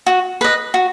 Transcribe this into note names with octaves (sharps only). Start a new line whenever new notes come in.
F#4
B4 D#5
F#4